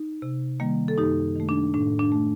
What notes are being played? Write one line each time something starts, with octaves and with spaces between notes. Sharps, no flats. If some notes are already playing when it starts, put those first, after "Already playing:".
Already playing: D#4
C3
D#3 G3 A#3
A4
F#2 D#4 G4
D#3 A3
D4
A2 D4
D4
A3